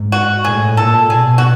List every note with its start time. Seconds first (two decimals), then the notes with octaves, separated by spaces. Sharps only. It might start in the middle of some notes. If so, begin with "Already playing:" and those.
Already playing: G#2
0.12 F#4
0.44 A2 G#4
0.77 A#2 A4
1.10 B2 G#4
1.38 F#4